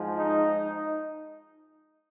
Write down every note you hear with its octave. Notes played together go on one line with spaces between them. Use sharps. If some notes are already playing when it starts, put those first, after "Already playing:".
Already playing: G#2 F3 G#3
D#4